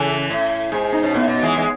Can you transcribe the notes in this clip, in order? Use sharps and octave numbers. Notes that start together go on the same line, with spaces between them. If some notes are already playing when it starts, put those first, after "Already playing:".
Already playing: C#3 E3 A4
A2
G#2 G#4
D#4
B2 C#4
A2 B3
B2
E3 G#3
E3 G#3